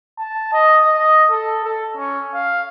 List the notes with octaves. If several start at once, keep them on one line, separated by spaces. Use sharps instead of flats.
A5
D#5
D#5
A4
A4
C#4
F5